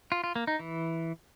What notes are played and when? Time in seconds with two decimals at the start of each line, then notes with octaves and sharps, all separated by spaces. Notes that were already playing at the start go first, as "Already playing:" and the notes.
0.12 F4
0.24 F4
0.36 A#3
0.47 D#4
0.59 E3